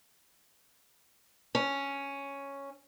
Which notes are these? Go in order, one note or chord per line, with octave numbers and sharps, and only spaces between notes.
C#4